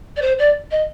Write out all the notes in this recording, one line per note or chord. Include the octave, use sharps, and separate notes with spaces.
D5
C5
D5
D#5